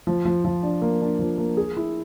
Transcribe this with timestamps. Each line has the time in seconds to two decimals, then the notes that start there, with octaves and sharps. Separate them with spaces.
0.07 F3
0.25 F3
0.45 F3
0.63 D4
0.82 A#3
1.01 D4
1.19 F3
1.38 A#3
1.57 G#4
1.77 E4